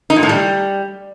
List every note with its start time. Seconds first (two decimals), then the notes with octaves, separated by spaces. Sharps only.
0.10 D#4
0.16 A#2
0.23 A2
0.29 G3